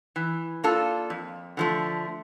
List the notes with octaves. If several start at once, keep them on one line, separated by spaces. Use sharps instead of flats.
E3
A#3 D4 F4 A4
F2
D3 F3 A3